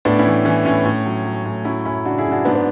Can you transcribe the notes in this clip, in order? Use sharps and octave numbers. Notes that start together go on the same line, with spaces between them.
A2 B3 D4
C#4 E4
E3
E3 C#4
A2 C#4
A2
F#3
F#3
A2
F#3 C#4 E4
F#2 C#4 E4
C#3 D4 F#4
E4 G#4
F#2
D4 F#4
G#2 B3 D4
B3